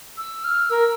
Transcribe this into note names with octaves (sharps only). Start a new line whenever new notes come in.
E6
F6
A#4 E6